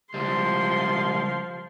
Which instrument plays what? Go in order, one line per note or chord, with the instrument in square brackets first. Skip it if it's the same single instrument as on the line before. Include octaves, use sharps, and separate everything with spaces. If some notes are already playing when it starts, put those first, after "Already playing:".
[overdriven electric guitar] C#2 G3 [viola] F3 C6